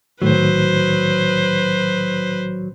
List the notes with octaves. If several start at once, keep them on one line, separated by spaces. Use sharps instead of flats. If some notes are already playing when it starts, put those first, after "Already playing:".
C2 A2 D#3 F#3 B4 C5